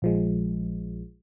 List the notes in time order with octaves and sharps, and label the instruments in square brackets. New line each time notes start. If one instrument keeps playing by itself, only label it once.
[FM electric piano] A#1 F3 G#3